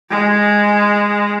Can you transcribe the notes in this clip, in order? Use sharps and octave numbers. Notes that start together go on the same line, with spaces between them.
G#3